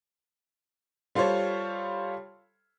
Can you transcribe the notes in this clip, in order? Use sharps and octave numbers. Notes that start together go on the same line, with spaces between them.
G3 F4 A4 C5 C#5